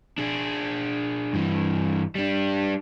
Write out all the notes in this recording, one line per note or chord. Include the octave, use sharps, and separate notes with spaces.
D4 G#4
G2 E3
G3 D4